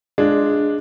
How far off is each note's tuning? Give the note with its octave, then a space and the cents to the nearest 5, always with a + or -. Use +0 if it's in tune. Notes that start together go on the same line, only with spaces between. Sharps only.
G#3 +0 D4 +0 F4 -20